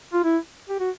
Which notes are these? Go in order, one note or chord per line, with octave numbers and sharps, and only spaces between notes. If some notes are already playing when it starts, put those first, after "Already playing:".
F4
E4
G4
F#4